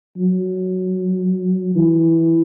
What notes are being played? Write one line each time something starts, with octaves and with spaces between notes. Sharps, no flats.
F#3
E3